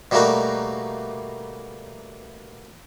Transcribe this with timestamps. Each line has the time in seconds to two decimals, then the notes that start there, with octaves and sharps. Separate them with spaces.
0.11 B2 G3 A3 A#3 D#4 F#4